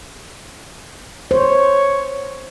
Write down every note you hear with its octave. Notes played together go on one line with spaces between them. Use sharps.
C5 C#5